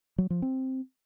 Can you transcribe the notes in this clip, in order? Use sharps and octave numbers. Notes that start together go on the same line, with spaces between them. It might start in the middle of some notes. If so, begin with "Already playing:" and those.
F#3
F3
C4